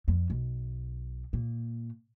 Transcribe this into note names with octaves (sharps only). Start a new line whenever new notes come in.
F2
B1
A#2